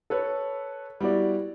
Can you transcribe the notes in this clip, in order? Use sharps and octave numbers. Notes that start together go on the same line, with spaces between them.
A4 B4 C#5
G3 B3 E4 F#4 D5